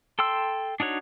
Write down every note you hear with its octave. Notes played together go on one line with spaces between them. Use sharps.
A4 G5 C6 E6
D4 D#4 F#4 C#5